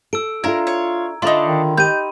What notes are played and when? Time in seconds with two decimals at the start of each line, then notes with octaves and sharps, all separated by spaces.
0.13 A4 E6 D7
0.44 D4 E4 F4 A4 A#4 A#5 G#6
0.67 C#5
1.22 D3 D4 D#4 F4 E5 B5 C6
1.46 D#3
1.77 D#4 G4 D#5 B5 G6 D#7